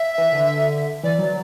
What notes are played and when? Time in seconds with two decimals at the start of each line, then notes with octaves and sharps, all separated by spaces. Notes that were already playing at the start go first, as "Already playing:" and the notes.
Already playing: E5
0.18 E3
0.32 D3
1.03 E3 D5
1.18 F#3